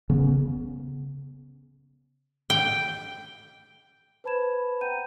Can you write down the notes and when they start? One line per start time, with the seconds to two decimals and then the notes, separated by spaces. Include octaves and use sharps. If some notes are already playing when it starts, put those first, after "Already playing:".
0.10 C#3 B3
2.50 G5
4.24 B4 C5 A5 B5 G#6 E7
4.81 F#5 G5 A#5 G6 D#7